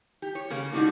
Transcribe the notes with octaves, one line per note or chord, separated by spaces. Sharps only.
G4
C#5
C#3 A#3
A2 G3 G#3 D4 D#4 F#4